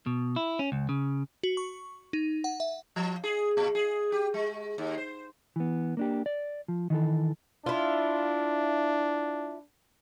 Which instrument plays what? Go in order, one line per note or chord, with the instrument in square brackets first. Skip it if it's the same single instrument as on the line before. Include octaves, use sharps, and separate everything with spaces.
[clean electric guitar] B2
E4
C#4
C#2
C#3
[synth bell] F#4
C#6
D#4
F#5
E5
[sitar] F3
G#4
A#2
G#4
G4
G#3
D#2
C5
[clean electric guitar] E3 B3
A#3 D4 G4
D5
F3
D#3 E3 A4
[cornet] D4 [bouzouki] E4 F4